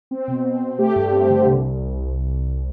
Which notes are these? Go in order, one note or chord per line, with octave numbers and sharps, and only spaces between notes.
C4
B2
C4
C4
A3 G4
G2
C4
D3
C2
C2
C2